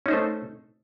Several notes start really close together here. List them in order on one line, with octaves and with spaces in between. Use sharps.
C#4 D#4 C5 A3